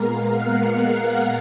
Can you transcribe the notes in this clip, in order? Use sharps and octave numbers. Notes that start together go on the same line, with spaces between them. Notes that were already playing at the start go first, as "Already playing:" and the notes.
Already playing: A#2 G#3 B3 A#4 F5
F#5
F5